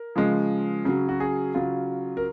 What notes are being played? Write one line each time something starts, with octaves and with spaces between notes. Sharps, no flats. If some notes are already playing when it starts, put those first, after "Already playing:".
Already playing: A#4
C#3 F3 G#3
C#3 F#3
F#4
G#4
C#3 F#3 F4
A#4